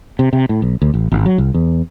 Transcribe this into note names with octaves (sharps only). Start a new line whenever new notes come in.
C3
C3
A2
B1
D2
A1
G#1
F#3
C2
E2